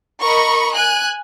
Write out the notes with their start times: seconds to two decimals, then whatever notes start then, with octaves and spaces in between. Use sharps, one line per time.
0.21 A#4 D#5 B5 C#6
0.72 G#5 F#6